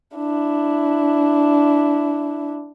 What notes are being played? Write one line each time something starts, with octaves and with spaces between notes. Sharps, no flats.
D4 E4